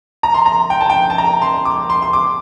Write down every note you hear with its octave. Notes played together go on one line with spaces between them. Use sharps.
A#5
C6
A#5
G5
A5
G5
A5
A#5
C6
D6
C6
C6
D6